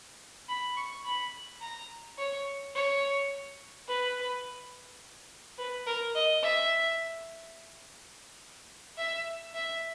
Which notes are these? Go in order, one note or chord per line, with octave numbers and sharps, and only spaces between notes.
B5
C#6
B5
A#5
C#5
C#5
B4
B4
A#4
D#5
E5
E5
E5